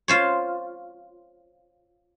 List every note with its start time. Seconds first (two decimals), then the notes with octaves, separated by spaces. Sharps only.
0.08 F4 C5 C#5